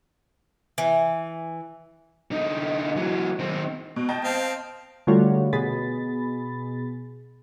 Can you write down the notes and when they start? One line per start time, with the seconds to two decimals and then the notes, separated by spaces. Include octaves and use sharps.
0.78 E3
2.31 D3 D#4
2.96 E3 F#3
3.39 D#3 C4
3.96 B2
4.09 D#5 G5 A5
4.24 C4 F5
5.07 D3 G3 A3 F4 F#4 C#5
5.53 B2 G#4 B5 A6